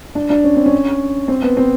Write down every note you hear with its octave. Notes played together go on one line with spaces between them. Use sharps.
D4
D4
C#4
C4
C#4
C4
B3
C4